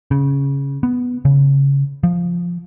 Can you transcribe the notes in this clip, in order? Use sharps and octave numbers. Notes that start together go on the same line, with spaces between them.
C#3
B3
C#3
F3